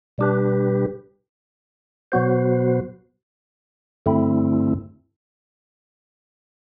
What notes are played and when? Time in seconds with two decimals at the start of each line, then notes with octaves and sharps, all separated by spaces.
0.18 B2 G3 D4 G4 B4
2.12 B2 F#3 B3 F#4 C5
4.06 G2 D3 A3 C4 E4